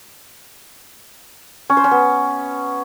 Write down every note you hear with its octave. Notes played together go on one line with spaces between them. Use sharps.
C#4
C5
C#4
B3